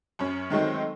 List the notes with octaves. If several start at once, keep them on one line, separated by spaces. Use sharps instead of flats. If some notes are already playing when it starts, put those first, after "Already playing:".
F#2 C#4
D#3 F#3 G#3 A3 C4